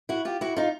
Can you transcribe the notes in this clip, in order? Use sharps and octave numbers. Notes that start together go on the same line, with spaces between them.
E4 F#4
F4 G4
E4 F#4
D#4 F4